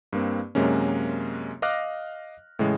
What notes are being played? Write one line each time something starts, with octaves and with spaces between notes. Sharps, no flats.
G2 A#3 C4
F#2 C3 G#3 A#3 C#4
D#5 F5 D6 F6 F#6 A#6
A2 C#3 E3 G#3